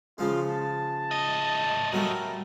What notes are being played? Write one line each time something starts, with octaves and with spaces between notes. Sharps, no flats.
C#3 F3 G#3 F4
A5
A2 D#5
F#3 G3 A3 A#4